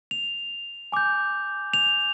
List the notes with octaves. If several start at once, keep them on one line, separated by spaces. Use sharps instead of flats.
F7
G#5 D6 G6
F7